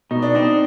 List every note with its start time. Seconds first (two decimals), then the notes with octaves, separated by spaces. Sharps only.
0.11 B2 D#4
0.22 D4
0.35 C4 D#4